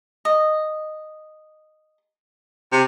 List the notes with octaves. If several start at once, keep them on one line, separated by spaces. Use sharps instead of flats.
D#5
C3